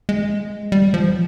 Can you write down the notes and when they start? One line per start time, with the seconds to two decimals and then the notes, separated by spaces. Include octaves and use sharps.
0.09 G#3
0.72 G3
0.94 F3